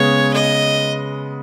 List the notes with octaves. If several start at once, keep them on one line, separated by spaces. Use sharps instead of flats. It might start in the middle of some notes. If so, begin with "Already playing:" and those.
Already playing: C#3 G#3 B3 C#5
D#5